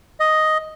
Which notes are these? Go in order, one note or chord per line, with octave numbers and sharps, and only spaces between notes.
D#5